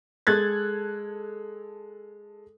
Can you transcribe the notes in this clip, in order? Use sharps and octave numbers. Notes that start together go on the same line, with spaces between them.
G#3 A4 F#6 G#6 A6